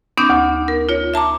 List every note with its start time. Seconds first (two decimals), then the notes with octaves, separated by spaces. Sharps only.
0.17 B3 C#4 D#4 D6 G6
0.30 D2
0.68 A#4
0.89 F4 C#5
1.14 E5 A5 A#5 D6